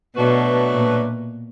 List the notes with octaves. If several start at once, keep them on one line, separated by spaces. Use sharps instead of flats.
B2 F#3 A3 D4 F#4 B4
A#2